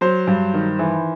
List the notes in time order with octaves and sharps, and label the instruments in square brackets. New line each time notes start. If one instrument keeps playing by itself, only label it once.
[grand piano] F#3 C5
G2
D#3
E3